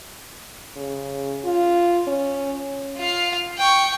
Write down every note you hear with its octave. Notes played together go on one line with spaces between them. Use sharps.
C#3
F4
C#4
F4 F5
G5 C#6